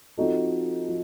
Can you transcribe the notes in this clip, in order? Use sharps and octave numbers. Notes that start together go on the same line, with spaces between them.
F3 C4 D#4 F#4 A4
F3